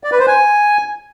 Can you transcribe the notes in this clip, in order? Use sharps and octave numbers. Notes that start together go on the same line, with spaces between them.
D5
B4
C5
G#5